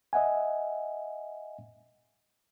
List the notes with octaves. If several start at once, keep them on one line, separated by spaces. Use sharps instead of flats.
D#5 E5 F#5 G#5